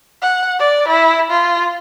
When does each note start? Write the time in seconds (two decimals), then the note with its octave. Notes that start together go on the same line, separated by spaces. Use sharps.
0.22 F#5
0.59 D5
0.88 E4
1.30 F4